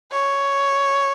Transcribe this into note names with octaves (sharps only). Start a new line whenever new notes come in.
C#5